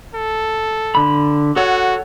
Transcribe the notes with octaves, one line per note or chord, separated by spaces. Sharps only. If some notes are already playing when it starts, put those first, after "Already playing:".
A4
D3 B5
F#4 A4 C#5 F#5